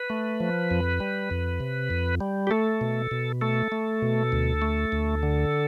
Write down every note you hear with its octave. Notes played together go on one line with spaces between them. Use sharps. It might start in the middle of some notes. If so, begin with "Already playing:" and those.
Already playing: B4
A3
F3
F2
G3
F2
C3
F2
G3
G4
A3 A4
B2
B2
A3 A4
A3
B2
D2
A3
D2
D3